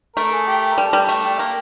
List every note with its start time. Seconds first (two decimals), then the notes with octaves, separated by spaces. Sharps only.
0.16 A3 A#4
0.32 G#4
0.47 G4
0.71 A#4
0.78 G3 A4
0.93 G3
1.08 A3 G4
1.24 G4
1.39 A#3